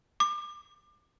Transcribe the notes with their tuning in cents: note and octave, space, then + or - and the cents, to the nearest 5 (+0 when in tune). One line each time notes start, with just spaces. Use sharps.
D6 +30